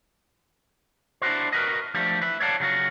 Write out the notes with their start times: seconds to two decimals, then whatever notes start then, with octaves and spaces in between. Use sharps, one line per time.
1.22 D4 E4 F#4 C5
1.53 F#4 A#4 B4 D#5
1.94 F3 G3 A3 D4 G4
2.21 B4 E5
2.40 C#5 D5 F5 F#5 A5
2.60 C#3 F#3 F4 F#4